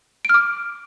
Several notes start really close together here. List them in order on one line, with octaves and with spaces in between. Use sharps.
D7 F6 D6